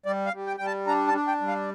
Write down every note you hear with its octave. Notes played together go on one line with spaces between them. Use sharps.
G3 D5
F5
G3
G5
G3 G5
A5
D4 A#5
A5
D4
G5
G3
F5